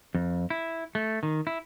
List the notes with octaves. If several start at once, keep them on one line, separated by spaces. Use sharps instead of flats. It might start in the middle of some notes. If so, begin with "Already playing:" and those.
F2
E4
A3
D#3
E4